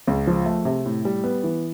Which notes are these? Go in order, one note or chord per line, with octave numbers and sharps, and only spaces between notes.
C#2
F3
A3
C3
A2
G3
B3
E3